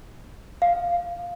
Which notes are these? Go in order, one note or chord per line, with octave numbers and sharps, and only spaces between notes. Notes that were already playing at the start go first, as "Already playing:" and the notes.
F5